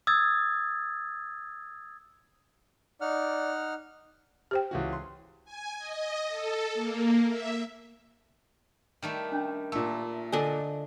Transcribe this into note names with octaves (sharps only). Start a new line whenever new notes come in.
D#6 E6 G#6 A6
D#4 D5 F#5 F6
G4 C5 G5
C#2 E3 F#4
C6
G#5
D#5
A4
A#3
E5
D#3 G3 A3
C#4 D4
A#2 A3 E6
D3 D4 A4 A#4 D#5 G#5